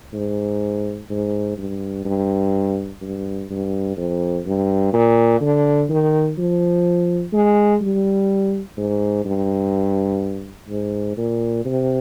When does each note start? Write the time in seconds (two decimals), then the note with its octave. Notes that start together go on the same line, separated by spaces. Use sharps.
0.14 G#2
1.10 G#2
1.58 G2
2.05 G2
3.01 G2
3.50 G2
3.97 F2
4.46 G2
4.93 A#2
5.41 D3
5.90 D#3
6.38 F3
7.33 G#3
7.81 G3
8.78 G#2
9.25 G2
10.70 G#2
11.17 A#2
11.65 C3